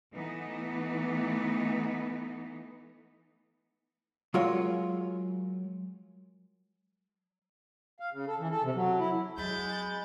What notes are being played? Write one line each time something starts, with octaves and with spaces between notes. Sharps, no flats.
E3 A3 B3 D#4
F#3 G#3 F4 A#4 C#5
F5
C#3
A4
E3
A4
C3
F#3
E4
F#3 G#3 C4 B5 G6 A6